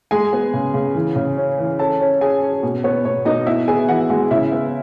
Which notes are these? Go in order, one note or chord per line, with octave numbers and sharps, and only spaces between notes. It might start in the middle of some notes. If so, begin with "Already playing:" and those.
G#3 G#4 G#5
B3
C#3
C#3
E3
C#3
C#4
E3
C#4 A4 A5
C#4
C#4 G#4 G#5
C#4
B2
B3 C#5
B2 C#5
B2 D#4 D#5
B3 E4 E5
B3 G#4 G#5
E3 F#4 F#5
G#3 F#4 F#5
C#3 E4 E5
B3